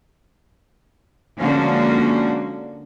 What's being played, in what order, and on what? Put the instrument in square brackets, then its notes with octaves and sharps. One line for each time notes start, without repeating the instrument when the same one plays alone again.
[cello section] D3 F3 G#3 A#3 C#4 F#4